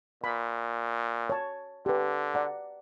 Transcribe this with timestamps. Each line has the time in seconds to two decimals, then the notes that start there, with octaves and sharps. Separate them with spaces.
0.24 A#2 B5
1.30 C#5 A5
1.86 D3 G4 B4
2.34 D5 F#5 A#5